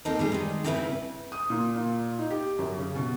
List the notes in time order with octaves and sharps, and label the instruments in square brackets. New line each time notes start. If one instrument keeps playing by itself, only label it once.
[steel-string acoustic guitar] D2 A#3 C4 C#4 D#4 A4
G3 A3 G#4
D#3 G#3
G2 C#3 C4 E4 A4 B4
[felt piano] D#6
A#2
A#2
D#4
G4
F#2
C#3
B2